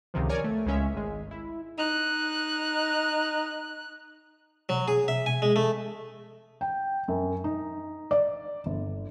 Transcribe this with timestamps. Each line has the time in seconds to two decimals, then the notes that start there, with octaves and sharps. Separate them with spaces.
0.14 C#2 C3 D#3 F3
0.29 A#4 C#5 D5 G#5
0.44 A3
0.66 C#2 G#3 C#4 E5
0.94 G#1 G#3
1.31 E4
1.79 D#4 F#6
4.69 F#3
4.88 G#4
5.08 E5
5.26 G#5
5.42 G#3
5.56 A3
6.61 G5
7.08 F#2
7.44 D#4
8.11 D5
8.66 G1